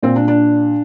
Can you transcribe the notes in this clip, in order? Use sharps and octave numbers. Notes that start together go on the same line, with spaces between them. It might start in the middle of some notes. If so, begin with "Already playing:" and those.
A#2 C4
D4
D4